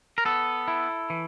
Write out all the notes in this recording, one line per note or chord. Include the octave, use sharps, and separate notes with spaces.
A#4
B3 A4
E4
E3